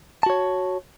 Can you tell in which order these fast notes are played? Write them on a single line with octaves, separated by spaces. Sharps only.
A5 F#4 C#5